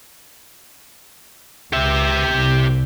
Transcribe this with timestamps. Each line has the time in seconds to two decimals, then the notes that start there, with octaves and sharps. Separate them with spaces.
1.73 C#2 G4 E5
2.30 C2